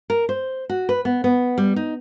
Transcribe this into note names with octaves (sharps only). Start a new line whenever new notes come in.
A#4
C5
F#4
B4
B3
B3
G3
D#4